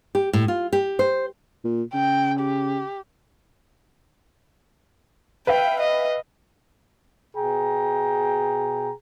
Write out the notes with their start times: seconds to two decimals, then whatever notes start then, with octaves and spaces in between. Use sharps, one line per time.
0.15 G4
0.33 A2
0.48 F4
0.73 G4
0.99 C5
1.64 A#2
1.94 C#3 G5
2.40 G4
5.47 B4 E5 F5 G5
5.80 D#5
7.36 B2 G#4 G5 A#5